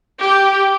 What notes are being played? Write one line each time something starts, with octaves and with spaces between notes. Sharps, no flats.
G4